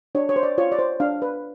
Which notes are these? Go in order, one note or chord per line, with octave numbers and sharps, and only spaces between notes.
D4 C#5
C#5
C5
D5
F4 C#5
D5
C5
D4 F5
B4